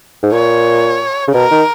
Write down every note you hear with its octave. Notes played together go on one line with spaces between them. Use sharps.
G#2
A#2 C#5
C#3
B2 A#4
D#3